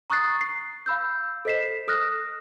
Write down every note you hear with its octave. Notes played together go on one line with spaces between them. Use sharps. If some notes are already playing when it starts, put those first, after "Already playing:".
A#5 C#6 D#6 F#6 A6 C7
C7
F5 B5 E6 G6
A4 C5 D#5 B6 C7 E7
A4 D#6 F6 F#6 A#6